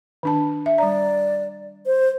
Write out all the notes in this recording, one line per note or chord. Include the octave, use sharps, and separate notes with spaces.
D#3 D4 A5
E5
G3 D5 A#5
C5